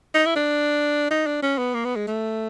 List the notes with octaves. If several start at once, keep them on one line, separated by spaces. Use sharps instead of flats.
D#4
E4
D4
D#4
D4
C#4
B3
A#3
B3
G#3
A3